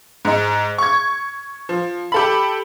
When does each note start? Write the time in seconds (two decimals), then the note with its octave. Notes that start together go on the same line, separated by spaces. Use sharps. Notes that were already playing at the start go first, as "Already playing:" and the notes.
0.25 G#2 D#4
0.78 C#6 G#6
1.69 F3
2.12 G4 A4 B5